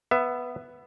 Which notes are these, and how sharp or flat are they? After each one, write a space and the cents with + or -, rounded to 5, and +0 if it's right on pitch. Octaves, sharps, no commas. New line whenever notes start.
B3 +0 E5 +20